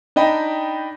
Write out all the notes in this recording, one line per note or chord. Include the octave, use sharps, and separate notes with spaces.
D4 D#4 D#5 G5 B5